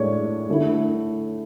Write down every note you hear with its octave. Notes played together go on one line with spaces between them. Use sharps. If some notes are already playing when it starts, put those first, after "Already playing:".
Already playing: A2 G#3 D4 C#5 D5
D3 A3 E4